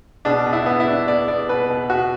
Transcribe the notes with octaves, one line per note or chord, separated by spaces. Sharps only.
B2 D4
B2
E4
B3
E4
D4
B3 D5
B3 D5
B2 B4
B2
B2 F#4